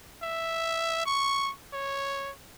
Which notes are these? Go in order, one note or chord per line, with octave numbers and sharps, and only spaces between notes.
E5
C#6
C#5